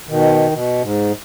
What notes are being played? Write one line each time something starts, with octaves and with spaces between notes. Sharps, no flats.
B2 D#3
B2
G#2